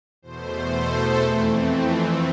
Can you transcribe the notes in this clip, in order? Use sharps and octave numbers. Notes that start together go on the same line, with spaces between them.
E2 B2 A3 C5
A4
F2 E3 A3 C4